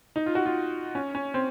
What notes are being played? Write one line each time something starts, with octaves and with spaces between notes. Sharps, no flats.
D#4
F4
F#4
F4
C#4
C#4
C4